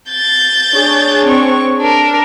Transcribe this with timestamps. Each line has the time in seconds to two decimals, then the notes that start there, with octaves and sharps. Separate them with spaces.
0.11 G6 A6
0.74 D4 G#4 C#5
1.24 C4 C#6
1.80 D4 A#4